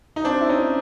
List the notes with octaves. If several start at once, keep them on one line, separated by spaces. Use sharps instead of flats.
D#4
C4 D4
E4
C#4 D#4